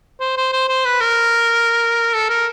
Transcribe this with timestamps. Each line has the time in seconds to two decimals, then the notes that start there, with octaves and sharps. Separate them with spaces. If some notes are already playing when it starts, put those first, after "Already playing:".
0.20 C5
0.37 C5
0.53 C5
0.68 C5
0.85 B4
1.01 A#4
2.14 A4
2.29 A#4